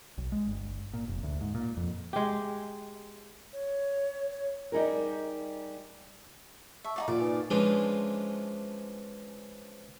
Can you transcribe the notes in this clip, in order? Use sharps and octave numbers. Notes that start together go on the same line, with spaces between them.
B1
G#3
G1
A#2
F1
D2
G#2
A#2
F2
G#3 G4
C#5
C#5
G3 D#4 G#4 A#4
E5 A5 C#6 E6
D#4 F4 D5
A#2 D5
D#4 B4 G#5
E3 F3 G#3 C#4 D4